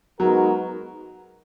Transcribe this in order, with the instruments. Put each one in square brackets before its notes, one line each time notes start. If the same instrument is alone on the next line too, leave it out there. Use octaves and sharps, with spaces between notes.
[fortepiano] F#3 [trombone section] G#3 B3 D#4 F#4 A#4